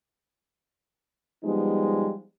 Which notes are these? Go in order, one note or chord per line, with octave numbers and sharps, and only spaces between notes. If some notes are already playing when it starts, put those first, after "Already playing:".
F3 G3 G#3 B3 D#4